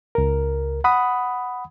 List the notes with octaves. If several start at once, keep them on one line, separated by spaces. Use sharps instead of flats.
C#2 A#4
F#5 B5 D#6